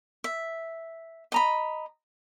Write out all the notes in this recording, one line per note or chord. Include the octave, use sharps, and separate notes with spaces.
E5
D#5 A#5 B5